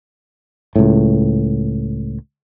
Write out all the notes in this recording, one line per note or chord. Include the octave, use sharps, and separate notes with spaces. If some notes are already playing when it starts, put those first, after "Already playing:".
C#2 A2